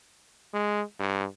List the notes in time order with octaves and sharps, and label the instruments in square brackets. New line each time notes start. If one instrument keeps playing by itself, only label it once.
[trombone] G#3
G2